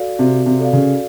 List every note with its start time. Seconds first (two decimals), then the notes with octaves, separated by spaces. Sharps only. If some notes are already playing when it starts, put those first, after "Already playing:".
Already playing: F#4 A4 D5 F5
0.19 C3 F#4
0.46 C3
0.60 A4 D5 F5
0.73 C#3